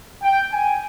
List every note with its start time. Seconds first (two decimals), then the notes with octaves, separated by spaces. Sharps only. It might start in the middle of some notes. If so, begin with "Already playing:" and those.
0.23 G5
0.52 G#5